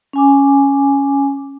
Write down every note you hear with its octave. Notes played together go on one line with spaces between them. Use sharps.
C#4 G#5 D6